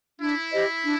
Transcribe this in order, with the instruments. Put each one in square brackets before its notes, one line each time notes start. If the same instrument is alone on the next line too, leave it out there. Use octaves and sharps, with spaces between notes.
[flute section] D4 [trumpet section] E4
[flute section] G4 C5 D#5
D4